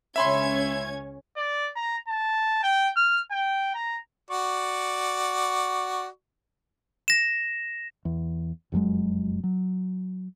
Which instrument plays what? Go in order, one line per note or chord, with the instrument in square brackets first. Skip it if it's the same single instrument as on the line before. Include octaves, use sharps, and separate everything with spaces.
[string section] C#2 C#4 G#6 [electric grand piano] E5 B5 C6
[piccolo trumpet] D5
A#5
A5
G5
F6
G5
A#5
[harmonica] F#4 D5 C#6
[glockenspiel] A#6 E7
[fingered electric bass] E2
F1 F#2 F#3 G#3
F#3